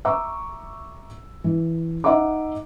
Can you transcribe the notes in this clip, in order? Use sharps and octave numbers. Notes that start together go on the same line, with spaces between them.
E5 A#5 C#6 D6 E6
E3
D#4 D#5 E5 F#5 A#5 D6